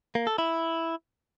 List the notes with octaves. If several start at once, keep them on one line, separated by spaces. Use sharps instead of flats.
A#3
A4
E4